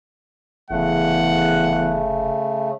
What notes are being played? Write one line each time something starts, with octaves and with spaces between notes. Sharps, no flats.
F1 E2 C#3 A3 F#5